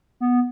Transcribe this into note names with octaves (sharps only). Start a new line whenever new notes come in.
B3